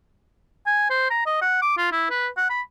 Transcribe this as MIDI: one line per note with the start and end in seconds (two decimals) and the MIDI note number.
0.66 0.90 80
0.90 1.09 72
1.10 1.26 82
1.26 1.37 75
1.42 1.59 78
1.62 1.75 86
1.78 1.89 65
1.92 2.06 64
2.10 2.28 71
2.37 2.49 78
2.49 2.61 83